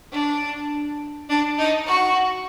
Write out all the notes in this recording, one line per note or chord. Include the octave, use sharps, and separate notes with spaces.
D4
D4
D#4
F#4